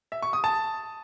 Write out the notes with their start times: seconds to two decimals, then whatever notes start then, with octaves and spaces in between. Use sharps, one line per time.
0.12 E5
0.22 C#6
0.33 D#6
0.44 A5